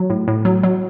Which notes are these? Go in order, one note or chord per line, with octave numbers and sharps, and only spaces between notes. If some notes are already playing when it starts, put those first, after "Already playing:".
Already playing: F#3
A2
A2
F#3
F#3